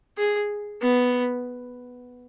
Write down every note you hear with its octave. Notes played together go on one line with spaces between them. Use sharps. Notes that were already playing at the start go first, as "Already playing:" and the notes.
G#4
B3